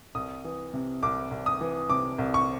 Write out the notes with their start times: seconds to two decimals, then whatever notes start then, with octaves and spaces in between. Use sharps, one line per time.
0.15 C2 D#6
0.45 E3
0.74 C3
1.03 C2 D6
1.31 C2
1.46 D#6
1.61 E3
1.90 C3 D6
2.19 C2
2.34 C#6